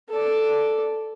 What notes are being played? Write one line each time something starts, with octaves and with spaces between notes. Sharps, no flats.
A4 D5